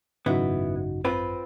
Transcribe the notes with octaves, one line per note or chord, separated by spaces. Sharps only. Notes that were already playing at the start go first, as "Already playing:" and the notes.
G#1 F#2 C#3 B3 D#4 E4 F#4
C4 F4 B4